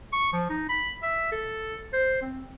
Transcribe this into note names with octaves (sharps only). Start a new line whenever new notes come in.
C#6
F3
D#4
B5
E5
A4
C5
C4